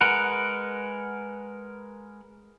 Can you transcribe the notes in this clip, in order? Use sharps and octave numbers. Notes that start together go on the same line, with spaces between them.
G#3 A#4 B4 F#5